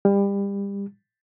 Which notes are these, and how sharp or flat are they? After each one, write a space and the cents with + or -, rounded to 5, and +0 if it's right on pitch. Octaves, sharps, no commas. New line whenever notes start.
G3 +30